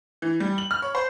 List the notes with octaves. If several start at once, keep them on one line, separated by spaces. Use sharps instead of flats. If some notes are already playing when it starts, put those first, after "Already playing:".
E3
G3
F#7
F6
C#5
C5